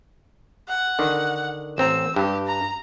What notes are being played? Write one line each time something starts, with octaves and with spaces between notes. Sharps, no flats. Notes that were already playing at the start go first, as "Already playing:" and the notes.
F#5
D3 D#3
A1 C4 A#5 E6
G2 G4
A#5